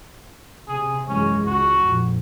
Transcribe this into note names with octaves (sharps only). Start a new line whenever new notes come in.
C3 G#4
F#2 E3 G#3 C#4
C#2 F#4
A#1 F2